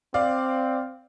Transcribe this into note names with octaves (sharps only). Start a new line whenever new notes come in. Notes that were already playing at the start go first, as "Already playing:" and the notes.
C4 D5 F5